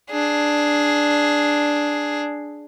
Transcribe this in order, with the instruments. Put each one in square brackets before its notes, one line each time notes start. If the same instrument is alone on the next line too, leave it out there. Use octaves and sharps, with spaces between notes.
[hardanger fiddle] D4 G#4